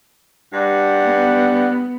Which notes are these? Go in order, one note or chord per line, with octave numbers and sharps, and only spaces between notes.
G2 G3 F#5
B3